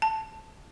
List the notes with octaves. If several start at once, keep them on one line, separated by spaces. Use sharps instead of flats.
A5